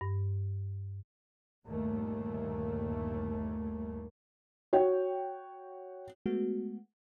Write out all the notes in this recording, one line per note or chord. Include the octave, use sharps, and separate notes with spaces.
G2
G1 D#2 A#2 A3 A#3
F#4 C#5 G5
G#3 A3 B3 F#4